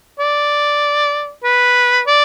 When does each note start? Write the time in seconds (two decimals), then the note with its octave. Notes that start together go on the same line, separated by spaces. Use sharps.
0.19 D5
1.44 B4
2.07 D5